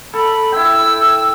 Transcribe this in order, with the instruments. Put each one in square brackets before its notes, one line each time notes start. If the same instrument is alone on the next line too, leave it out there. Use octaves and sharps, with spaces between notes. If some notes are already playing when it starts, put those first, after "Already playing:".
[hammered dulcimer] A4 [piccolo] B5
[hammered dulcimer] E4 G5 [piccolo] E6